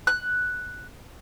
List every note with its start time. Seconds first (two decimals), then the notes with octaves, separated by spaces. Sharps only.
0.07 F#6